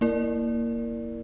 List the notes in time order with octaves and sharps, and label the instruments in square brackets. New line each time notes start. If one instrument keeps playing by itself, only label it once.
[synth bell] A#3 E4 A#4 D5